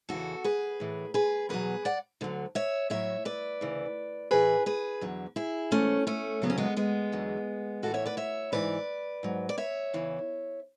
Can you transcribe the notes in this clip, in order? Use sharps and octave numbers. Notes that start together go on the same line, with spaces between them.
E2 C#3 E3 F#4 A4
G#4 B4
A2 E3
G#4 B4
E2 B2 F#3 G#4 B4
D5 F#5
D2 D3 F#3
C#5 E5
A2 F#3 C#5 E5
B4 D5
D2 C#3 E3
A2 E3 G#4 B4
G#4 B4
E2 D3 F#3
E4 G#4
G#2 E3 A3 C#4
A3 C#4
D2 C#3 F#3 B3
C#4
G#3 B3
G#3 B3
E2 D3 F#3
A2 E3 F#4 A4
C#5 E5
B4 D5
C#5 E5
G#2 E3 B4 D5
G#2 F#3
D5
C#5 E5
E2 C#3 E3